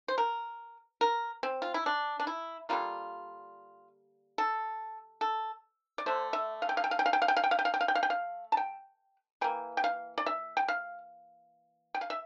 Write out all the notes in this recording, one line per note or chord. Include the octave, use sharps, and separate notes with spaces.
C5
A#4
A#4
C4
F4
E4
D4
D4
E4
D3 G3 A#3 F4
A4
A4
D5
D3 A3 C5
E5
F5
G5
F5
G5
F5
G5
F5
G5
F5
G5
F5
G5
F5
G5
F5
G5
F5
G5
F5
G5
F5
A5
G5
E3 A#3 G5
G5
F5
D5
E5
G5
F5
G5
F5
E5